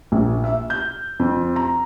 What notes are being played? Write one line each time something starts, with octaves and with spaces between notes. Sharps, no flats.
A#1
E5
G6
F2
A#5